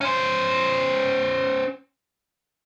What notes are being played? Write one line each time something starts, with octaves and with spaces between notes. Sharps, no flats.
C#4 C5